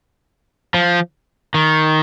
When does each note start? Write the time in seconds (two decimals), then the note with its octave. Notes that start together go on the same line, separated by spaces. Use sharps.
0.74 F3
1.54 D#3